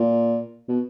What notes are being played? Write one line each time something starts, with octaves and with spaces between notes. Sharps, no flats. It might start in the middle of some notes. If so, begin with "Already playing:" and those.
Already playing: A#2
B2